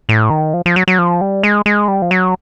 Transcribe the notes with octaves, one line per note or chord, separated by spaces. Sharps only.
A2
D#3
F3
F3
F#3
F#3
F3
G3
G#3
G#3
G3
F3
F#3